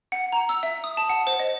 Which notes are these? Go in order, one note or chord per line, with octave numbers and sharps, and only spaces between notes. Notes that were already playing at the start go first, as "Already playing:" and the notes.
F#5
A#5
E6
E5
D#6
A5
F#5
C5
D#5